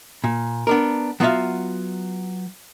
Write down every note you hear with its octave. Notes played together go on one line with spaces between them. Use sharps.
A#2
B3 D4 A#4
F#3 B3 F4 C#5 E5 F5